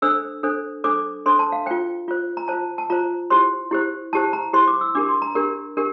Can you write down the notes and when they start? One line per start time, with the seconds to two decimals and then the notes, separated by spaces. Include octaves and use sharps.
0.02 D4 A4 C5 E6
0.43 D4 A4 C5
0.84 D4 A4 C5 D6
1.26 D4 A4 C5 C6
1.39 A5
1.52 F5
1.66 F4 C5 G5
2.08 F4 C5
2.37 A#5
2.48 F4 C5 A5
2.78 A5
2.90 F4 C5 A#5
3.30 E4 G4 C5 C6
3.71 E4 G4 C5
4.13 E4 G4 C5 A5
4.33 A#5
4.53 E4 G4 C5 C6
4.68 D6
4.81 E6
4.95 D4 G4 A#4 D6
5.09 C6
5.22 A#5
5.35 D4 G4 A#4
5.77 D4 G4 A#4